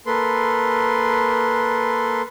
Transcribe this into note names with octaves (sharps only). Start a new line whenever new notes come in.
A#3 A4 B4 C6